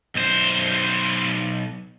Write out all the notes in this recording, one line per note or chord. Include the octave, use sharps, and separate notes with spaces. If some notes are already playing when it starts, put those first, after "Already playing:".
B1 C5